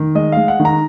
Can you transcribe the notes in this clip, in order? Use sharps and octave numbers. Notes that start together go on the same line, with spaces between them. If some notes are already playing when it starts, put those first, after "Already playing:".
Already playing: D#3
G#3 D#5
G#3 F5
F#5
D#3
A#5